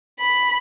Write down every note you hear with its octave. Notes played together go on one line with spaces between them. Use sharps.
B5